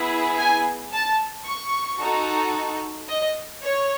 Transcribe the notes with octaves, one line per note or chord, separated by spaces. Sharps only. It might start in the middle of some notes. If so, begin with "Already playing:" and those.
Already playing: B3 E4 G#4
G#5
A5
C#6
D#4 F#4 A4
D#5
C#5